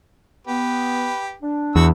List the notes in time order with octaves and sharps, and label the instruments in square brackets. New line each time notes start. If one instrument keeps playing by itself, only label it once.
[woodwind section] B3 [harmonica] G4 B4
[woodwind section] D4
[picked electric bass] E2 [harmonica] F#4 C#6 E6